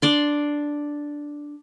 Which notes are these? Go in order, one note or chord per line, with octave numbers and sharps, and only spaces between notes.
D4 D5 C6